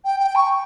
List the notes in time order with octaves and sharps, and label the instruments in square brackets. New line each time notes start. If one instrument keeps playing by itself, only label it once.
[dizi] G5
G5
C#6